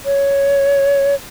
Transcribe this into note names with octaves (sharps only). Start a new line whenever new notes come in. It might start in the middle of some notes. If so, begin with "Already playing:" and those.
C#5